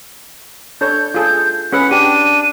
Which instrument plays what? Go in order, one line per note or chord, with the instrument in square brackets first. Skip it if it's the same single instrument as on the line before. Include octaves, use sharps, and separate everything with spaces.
[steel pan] D4 A4 C#5 [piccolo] G6
[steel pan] F4 G#4 A4
[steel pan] C#4 G#4 B4 [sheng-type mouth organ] F#5
[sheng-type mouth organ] D4 [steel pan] G4 G5 [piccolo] D#7